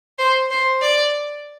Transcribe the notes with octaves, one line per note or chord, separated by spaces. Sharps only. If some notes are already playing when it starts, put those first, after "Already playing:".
C5
C5
D5